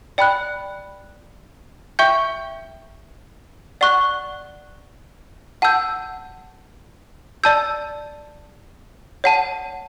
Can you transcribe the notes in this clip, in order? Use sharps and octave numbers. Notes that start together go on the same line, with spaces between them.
D5 G5 B5 F#6
E5 G5 C#6 G6
D5 F#5 C#6 F#6
F#5 A5 E6 G6
D5 A5 E6 G6
C#5 F#5 A5